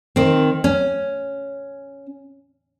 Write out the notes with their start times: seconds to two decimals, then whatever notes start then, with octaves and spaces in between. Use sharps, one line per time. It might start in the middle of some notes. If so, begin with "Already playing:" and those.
0.16 D#3 C4
0.64 C#4